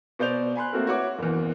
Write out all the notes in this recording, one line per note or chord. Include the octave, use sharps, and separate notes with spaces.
B2 C5 D5 G6 F7
G#5 B5 C6 F#6
A3 A#3 C4 F#4 A4 A#4
E4 F#4 B4 C#5 F#5 D6
F#1 E2